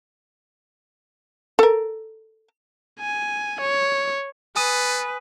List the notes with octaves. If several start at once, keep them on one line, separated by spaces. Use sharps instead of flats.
A4 A#4
G#5
C#5
A4 B4 G#5 D#6 D#7